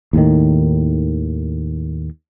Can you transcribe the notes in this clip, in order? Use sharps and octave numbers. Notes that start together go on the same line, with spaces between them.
D#2 A2 D#3